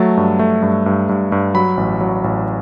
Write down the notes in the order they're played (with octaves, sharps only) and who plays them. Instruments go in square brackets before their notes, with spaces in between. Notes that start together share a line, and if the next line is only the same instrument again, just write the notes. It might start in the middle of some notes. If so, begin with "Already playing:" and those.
Already playing: [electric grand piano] F#3 A3 A5
G2
A3
G2
G2
G2
G2
F#3 B5
A1
F#3
A1